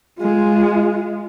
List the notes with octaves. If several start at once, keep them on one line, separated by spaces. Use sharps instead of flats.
G#3 F4